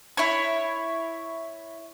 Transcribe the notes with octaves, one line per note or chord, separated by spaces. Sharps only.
E4 C#5